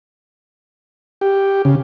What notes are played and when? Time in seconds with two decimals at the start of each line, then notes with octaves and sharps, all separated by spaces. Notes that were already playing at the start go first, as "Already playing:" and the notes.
1.21 G4
1.65 C#3